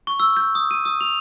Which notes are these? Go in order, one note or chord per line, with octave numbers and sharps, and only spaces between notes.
C#6
E6
G6
D#6
D#7
D#6
F7